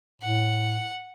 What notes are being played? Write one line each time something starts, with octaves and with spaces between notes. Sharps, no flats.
A2 F#5